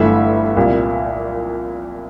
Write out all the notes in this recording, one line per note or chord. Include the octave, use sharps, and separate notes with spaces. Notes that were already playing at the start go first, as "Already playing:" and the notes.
Already playing: G1 G2 E3 A3 E5
C2 A#2 G3 A#3